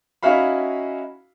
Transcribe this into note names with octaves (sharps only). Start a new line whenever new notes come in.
C#4 D#4 E4 F#4 F5 B5